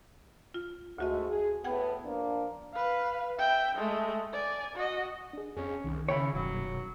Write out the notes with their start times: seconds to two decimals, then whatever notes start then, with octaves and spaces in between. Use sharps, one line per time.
0.54 F4
0.98 D2 G#2 G#3 A3 F#4 D#5
1.28 G#4
1.64 A2 B3 F#5 G5 G#6
2.04 F3 A#3 D4
2.74 B4 F5
3.38 E5 G5
3.75 G#3 A3
4.33 D5 G#5
4.76 F#4 D#5
5.33 D4 G#4
5.57 F2 C#4 G#4
5.84 C2 D#3
6.09 C#3 E4 C#5 G5 B5
6.34 D#1 F#2 B2 F#3